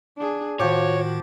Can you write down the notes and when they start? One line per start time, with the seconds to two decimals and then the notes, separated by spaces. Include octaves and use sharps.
0.18 D4 G#4
0.60 A2 D#3 F3 F#4 C#5 G5 D6